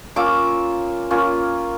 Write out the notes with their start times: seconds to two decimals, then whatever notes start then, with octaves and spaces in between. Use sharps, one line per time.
0.16 A#3 C#4 F4 D6 E6
1.11 A#3 C#4 F4